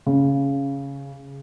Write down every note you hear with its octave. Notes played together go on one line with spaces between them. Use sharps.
C#3